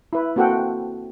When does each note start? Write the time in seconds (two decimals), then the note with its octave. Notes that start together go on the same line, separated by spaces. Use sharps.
0.13 E4 B4
0.36 A#3 C4 F#4 A4 F#5 G5